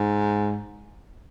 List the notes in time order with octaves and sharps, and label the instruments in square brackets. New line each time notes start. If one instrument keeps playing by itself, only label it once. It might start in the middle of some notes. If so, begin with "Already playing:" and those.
Already playing: [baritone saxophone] G#2